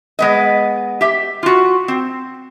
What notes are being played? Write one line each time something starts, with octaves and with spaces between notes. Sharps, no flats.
G#3 B3 D#5
G4 E5
F4 F#4
C4